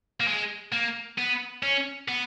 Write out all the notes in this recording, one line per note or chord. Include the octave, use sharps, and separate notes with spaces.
A#3
G#3
A#3
B3
C#4
B3